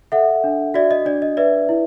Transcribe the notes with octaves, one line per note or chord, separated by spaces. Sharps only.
A4 E5 F#5
D4
F#4 D5 E5
D#5
D4 D5
D#5
B4 D5 E5
E4